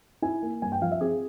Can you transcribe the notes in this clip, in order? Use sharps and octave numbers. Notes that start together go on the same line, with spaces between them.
E4 G#5
A#3
G2 G#5
G5
F3 F5
E5
C4 G#4